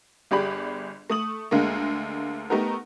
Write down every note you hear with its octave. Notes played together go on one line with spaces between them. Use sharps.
G1 G4 G#4 D5 B5
A3 D#6 F#7
D2 D3 G#3 A#3
A3 B3 D#4 G4 A#4